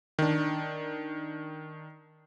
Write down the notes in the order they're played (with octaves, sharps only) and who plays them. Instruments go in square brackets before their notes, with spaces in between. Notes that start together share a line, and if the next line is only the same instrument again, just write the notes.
[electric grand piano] D#3 D4